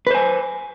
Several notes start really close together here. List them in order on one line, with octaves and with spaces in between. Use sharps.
B4 C5 G#5